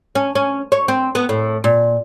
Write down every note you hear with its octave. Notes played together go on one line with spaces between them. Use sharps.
C#4
C#4
C#5
C4
B3
A2
A#2